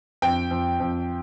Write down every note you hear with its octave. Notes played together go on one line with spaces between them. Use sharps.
F2 G5
F2
F2